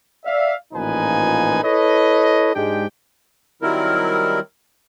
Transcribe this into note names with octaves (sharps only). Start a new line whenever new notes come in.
D5 E5 F5
A1 A#2 F3 D#4 B4 G#5
E4 A4 B4 C#5 D#5
G#2 G#3 D4 G4 G5
D#3 F#3 G3 C4 E4 A#4